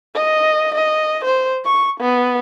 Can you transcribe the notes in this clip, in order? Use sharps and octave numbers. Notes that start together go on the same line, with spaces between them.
D#5
D#5
C5
C#6
B3